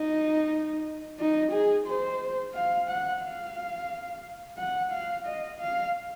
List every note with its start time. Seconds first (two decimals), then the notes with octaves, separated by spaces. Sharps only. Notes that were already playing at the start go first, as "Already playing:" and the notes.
Already playing: D#4
1.19 D#4
1.52 G#4
1.87 C5
2.54 F5
2.89 F#5
3.22 F5
4.58 F#5
4.91 F5
5.26 D#5
5.59 F5